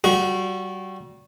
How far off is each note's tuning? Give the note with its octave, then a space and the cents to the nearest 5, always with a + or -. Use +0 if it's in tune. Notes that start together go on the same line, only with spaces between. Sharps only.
G3 -30 F#4 -15